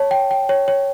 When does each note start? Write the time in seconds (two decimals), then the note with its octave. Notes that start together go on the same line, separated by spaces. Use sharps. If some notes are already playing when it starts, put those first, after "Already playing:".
Already playing: C#5 A5
0.11 G5
0.31 G5
0.49 C#5
0.68 C#5